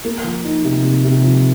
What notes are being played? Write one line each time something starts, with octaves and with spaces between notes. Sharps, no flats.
A#3
F3
D#4
C3
C3
C3
F3